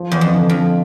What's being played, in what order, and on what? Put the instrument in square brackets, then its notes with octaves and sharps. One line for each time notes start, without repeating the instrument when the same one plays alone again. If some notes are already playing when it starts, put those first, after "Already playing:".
Already playing: [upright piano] F3
[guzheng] E2
F2
[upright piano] D3
[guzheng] F2